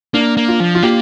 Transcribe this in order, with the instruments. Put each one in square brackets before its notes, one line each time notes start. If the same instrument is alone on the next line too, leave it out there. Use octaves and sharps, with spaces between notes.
[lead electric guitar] A#3 [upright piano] D4
[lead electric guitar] A#3
[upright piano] F4
[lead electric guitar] F3
[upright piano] F4
[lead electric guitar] A#3 [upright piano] G4